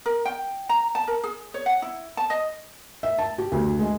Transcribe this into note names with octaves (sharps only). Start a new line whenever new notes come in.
A#4
G5
A#5
A5
A#4
G#4
C#5
F#5
E4
A5
D#5
E5
A5
G4
D2
G#3